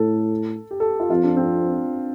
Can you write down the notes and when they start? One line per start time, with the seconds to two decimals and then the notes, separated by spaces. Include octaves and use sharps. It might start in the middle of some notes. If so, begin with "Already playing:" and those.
Already playing: A2 A4
0.71 G4
0.80 A4
1.00 F4
1.10 F2 F4
1.23 D4
1.37 C4